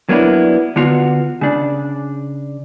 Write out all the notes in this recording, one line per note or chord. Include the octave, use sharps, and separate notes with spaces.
F#3 A#3 B3 D4 E4
D3 B3 F4 F#4
C#3 D4